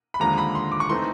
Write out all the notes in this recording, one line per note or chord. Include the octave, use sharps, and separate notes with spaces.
B5
D#2 D3 F3 G#3 A#5
B5
C6
D6
C#6
E3 A3 C4 D#4 C6